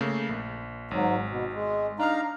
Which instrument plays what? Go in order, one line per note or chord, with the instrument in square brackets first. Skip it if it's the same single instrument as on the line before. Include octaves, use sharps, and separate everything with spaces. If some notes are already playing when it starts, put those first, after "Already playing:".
[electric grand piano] C#3 A3 A#3
A#1
[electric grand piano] G#1 [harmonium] G#2 F#3
[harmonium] B2
G#3
[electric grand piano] D4 F6 [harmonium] D#4 F5 A#5